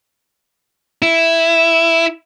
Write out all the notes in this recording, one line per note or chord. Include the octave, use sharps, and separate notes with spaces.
E4